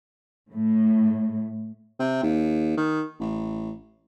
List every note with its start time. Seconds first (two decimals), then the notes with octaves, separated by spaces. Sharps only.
0.52 A2
1.99 C3
2.23 D#2
2.77 D#3
3.20 A1